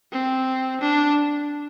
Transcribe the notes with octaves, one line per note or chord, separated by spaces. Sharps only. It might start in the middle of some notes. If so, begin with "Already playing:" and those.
C4
D4